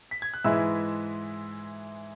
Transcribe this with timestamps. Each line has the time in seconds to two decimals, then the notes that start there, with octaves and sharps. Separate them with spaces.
0.11 B6
0.22 G#6
0.34 F#6
0.44 G#2 E3 G#3 E4 E5 E6